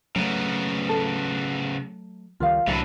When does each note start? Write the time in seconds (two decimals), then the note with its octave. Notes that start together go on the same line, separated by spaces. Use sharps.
0.16 C#3 F#3 A3 B3
0.89 A4
2.40 C#2 D#3 G3 F4 F5
2.67 C2 A2 D3 E3 F#3 E5 A5 B5